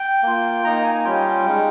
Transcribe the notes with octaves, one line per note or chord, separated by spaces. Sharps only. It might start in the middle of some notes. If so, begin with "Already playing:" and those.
Already playing: G5
A#3 F4
A#3 D#4 A#5
G#5
G#5
G3 C#4 F4 G5
G#3 D#4